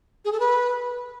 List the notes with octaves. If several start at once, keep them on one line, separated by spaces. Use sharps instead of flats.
G#4
A4
B4